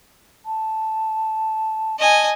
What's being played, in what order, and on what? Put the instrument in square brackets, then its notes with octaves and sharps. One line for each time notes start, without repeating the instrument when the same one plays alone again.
[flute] A5
[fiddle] D#5 G#5 [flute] A5